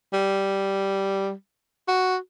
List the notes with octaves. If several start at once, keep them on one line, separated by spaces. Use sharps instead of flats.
G3
F#4